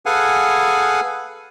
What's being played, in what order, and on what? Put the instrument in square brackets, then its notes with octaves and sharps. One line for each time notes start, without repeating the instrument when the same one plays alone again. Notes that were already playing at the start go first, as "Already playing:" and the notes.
[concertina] G#4 A4 B4 F5 F#5 G#5